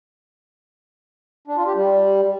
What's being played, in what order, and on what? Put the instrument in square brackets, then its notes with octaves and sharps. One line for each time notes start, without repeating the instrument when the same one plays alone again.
[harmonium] D4
F4
G4
G3